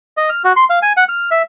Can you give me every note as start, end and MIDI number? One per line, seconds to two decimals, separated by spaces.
0.17 0.30 75
0.30 0.42 89
0.44 0.53 66
0.56 0.65 84
0.70 0.79 77
0.82 0.93 80
0.97 1.04 78
1.09 1.30 89
1.31 1.42 76